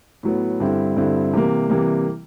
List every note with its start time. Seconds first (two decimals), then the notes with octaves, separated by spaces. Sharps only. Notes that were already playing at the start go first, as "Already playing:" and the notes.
0.23 A2 F#3 B3
0.60 G2 D3 G3 C4 E4
0.97 G2 D3 G3 C4 E4
1.33 C3 E3 G3 A#3
1.70 C3 E3 G3 A#3